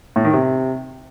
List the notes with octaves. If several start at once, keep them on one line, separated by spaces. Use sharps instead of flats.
A2
D#3
C3